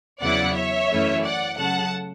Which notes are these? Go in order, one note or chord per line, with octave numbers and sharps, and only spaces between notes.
E2 C#3 F#3 B3 E4 D5 F#5
C#5 E5
F#2 E3 A3 C#4 E4
D5 F#5
C#3 F#3 A3 F#5 A5